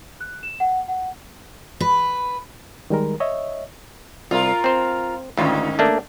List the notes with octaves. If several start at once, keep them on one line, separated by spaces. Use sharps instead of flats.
F#6
E7
F#5
F#5
B4
D#3 G3 G#3 A#4
C#5 D#5 E5
C2 F4 A#4
C4 C5
D2 G#2 D#3 C#4 F4
A3 A#3 D4